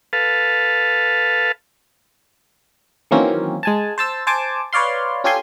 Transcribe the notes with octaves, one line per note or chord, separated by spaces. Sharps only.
A4 B4 F5 A5
D#3 E3 F#3 A#3 C4 C#4
G#3 G#5 A5
C5 A5 E6
C5 G#5 A5 D6
B4 C#5 D5 F5 C6
C#4 F4 G4 A4 G#5 C6